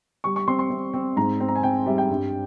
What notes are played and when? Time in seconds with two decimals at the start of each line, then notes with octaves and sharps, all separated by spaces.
0.24 G3 C#6
0.36 C#6
0.47 C4 C6
0.59 C6
0.70 C4
0.94 C4
1.16 G#2 A#5
1.40 C4
1.48 A#5
1.56 G#5
1.63 C4 G5
1.86 G3 E5
1.98 G5
2.10 G2